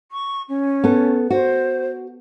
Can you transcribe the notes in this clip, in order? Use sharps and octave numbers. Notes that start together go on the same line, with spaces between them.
C#6
C#4
B3 A4
F#4 C5